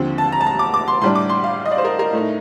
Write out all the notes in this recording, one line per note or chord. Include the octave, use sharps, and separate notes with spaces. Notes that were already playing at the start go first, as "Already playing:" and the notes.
Already playing: D#2 D3 F3 C4
A5
A#5
A5
A#5
D6
D6
C6
A2 G3 D4 C6
D6
C6
F5
D#5
D5
C5
A#4
A#4
A2 A3 D#4